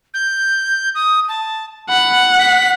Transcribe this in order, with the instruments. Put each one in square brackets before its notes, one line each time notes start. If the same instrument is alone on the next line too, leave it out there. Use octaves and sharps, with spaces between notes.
[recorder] G6
D#6
A5
[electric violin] F#5 [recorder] B5
[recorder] B6